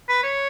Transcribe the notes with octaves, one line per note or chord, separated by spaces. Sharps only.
B4
C#5